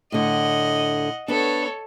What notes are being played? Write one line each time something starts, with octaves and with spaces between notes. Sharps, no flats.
A2 D3 D#5 F#5
B3 D4 A4 C#5